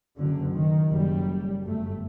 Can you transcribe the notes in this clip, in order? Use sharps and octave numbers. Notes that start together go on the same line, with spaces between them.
F#1 F#2 D3
D#3
F#1 F#2 G3
G1 F#2 A3